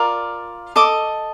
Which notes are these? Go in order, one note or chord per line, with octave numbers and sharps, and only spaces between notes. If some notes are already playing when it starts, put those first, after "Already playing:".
Already playing: F4 A#4 D5
A4 D#5 D6